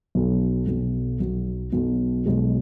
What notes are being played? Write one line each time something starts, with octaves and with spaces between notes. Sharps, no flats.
B1 B2 F#3
B1 B2 F#3
B1 B2 F#3
B1 B2 F#3
B1 B2 G#3